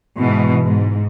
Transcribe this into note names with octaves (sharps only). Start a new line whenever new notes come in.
G#2 B2 E3
G#2